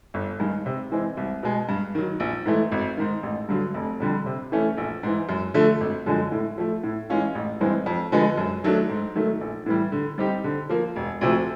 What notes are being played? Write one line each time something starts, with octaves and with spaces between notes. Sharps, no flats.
G1
G2 D#3 G#3
C3
E3 G#3 C4
C2
B2 G#3
G2
D#3 F#3
A#1
G#2 E3 A3
G#1
G#2 D#3
A1
G2 D3 F#3
F1
F2 D3 G3
C3
E3 A3 C#4
A#1
G#2 E3
F#2
D3 F3 A3
G#1
F#2 D3 F3 G#3
A2
F3 A3
A2
E3 G#3 C#4 F4
A1
G2 E3 G#3 C4
F2
D3 F3 G#3 B3
F#2
D#3 F#3 A3 D4
G#2
D#3 F#3 A3
A#1
A2 E3 G3
D3
G3 C4 D#4 G4
D3
F3 A#3
E1
D2 C3 F3